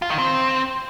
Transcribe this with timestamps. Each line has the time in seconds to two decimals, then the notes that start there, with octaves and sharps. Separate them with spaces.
0.02 F4
0.10 D#3
0.18 C4